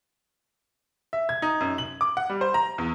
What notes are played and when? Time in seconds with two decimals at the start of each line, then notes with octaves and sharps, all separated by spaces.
1.13 E5
1.29 G#6
1.42 D#4
1.61 F#2
1.78 F#7
2.01 D6
2.17 F#5
2.30 G3
2.41 C5
2.54 A#5
2.78 E2